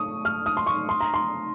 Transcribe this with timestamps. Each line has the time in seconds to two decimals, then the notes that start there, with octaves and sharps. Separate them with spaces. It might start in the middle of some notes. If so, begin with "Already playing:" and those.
Already playing: C#6 D#6
0.25 F6
0.46 D#6
0.57 C6
0.67 C#6
0.89 C6
1.01 A#5
1.14 C6